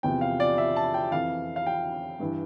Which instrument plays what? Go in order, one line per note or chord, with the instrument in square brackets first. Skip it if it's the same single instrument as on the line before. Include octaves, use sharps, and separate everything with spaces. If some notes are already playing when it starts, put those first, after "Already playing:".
[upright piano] E2 C3 F3 G5
F5
D5
E5
A5
G5
F2 E3 F5
F5
G5
G2 E3